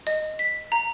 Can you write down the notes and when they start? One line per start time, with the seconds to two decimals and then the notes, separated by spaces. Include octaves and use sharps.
0.07 D#5
0.39 B6
0.72 A#5